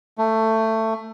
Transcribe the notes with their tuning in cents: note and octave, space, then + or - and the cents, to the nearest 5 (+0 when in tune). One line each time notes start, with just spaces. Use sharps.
A3 +15